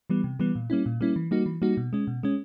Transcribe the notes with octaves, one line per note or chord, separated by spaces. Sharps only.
E3 G3 B3
C3
E3 G3 B3
A#2
G3 A#3 C#4 E4
A#2
G3 A#3 C#4 E4
E3
G3 A#3 D#4 F#4
E3
G3 A#3 D#4 F#4
B2
G#3 C#4
B2
G#3 C#4